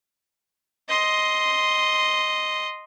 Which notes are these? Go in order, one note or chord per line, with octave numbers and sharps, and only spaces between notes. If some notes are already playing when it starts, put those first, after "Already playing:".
D#5 C6